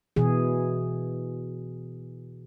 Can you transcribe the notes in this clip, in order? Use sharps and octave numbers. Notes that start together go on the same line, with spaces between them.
B2 E3 G#4